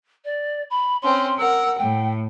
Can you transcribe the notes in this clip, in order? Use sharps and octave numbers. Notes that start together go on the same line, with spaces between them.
D5
B5
C4 C#4 C6
A#4 F#5 E6
A2 G5